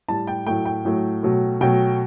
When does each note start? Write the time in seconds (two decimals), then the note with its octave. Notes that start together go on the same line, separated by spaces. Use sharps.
0.08 A2 G3 A5
0.27 G5
0.47 A2 F#3 A3 G5
0.66 G5
0.85 A2 F#3 A3
1.23 B2 F#3 A3
1.61 B2 F#3 A3 G5